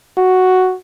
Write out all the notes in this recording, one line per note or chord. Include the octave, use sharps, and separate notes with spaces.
F#4